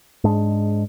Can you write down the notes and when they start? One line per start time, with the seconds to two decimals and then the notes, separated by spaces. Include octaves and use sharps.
0.24 G#2 G#3 D4